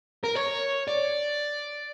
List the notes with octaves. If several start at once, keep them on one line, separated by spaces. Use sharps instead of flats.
A#4
C#5
D5